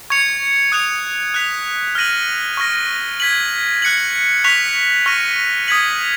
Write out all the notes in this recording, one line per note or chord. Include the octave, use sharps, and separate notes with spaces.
C#6 G#6 C#7 F7
D#6 F#6 C#7 F7
F#6 B6 F7
F6 A#6 D#7 F#7
C#6 F6 A#6
G#6 B6 F#7
F#6 C#7 F#7
C#6 F#6 B6 F7
C#6 F6 A#6 D#7
D#6 G#6 B6 F#7